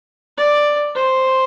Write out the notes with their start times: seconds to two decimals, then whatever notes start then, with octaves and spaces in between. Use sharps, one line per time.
0.37 D5
0.95 C5